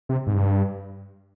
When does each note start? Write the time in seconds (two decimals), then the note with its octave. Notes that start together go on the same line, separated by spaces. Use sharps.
0.09 C3
0.27 G#2
0.34 G2